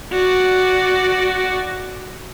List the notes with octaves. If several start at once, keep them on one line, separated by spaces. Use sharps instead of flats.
F#4 D5